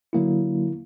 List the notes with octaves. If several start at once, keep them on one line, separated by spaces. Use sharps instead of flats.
D3 F#3 A#3 E4